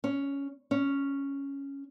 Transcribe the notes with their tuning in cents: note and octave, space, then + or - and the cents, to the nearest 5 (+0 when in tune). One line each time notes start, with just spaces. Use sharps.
C#4 +5
C#4 +0